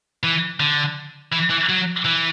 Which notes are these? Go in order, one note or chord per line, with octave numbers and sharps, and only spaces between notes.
E3
D3
E3
E3
F#3
E3